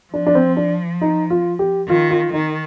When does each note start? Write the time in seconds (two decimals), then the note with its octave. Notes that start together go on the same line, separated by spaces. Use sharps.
0.13 F3 D4
0.27 D4
0.35 C4
0.57 D4
1.01 D#4
1.30 F4
1.59 G4
1.88 D#3 F4
2.10 F4
2.33 D#3 D#4